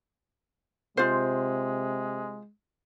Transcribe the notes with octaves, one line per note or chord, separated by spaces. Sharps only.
C3 G#3 F4 C5